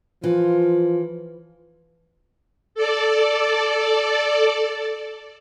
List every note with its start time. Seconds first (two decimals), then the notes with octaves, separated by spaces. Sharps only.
0.24 E3 F3 F4
2.75 A4 D5